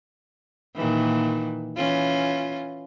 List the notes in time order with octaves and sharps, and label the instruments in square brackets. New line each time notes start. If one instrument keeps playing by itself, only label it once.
[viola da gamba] A#2 D#3 E3
E3 C#4 F4